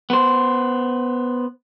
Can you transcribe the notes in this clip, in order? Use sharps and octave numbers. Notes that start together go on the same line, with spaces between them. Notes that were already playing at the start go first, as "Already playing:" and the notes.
B3 C5